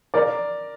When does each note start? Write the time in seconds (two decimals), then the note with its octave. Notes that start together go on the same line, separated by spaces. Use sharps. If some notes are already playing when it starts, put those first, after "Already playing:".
0.14 A#4 D5